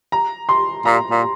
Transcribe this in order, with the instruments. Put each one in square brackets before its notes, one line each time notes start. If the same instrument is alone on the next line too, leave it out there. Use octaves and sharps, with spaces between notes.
[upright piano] A#5
C6
[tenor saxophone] A#2 [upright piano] A#5
[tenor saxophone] A#2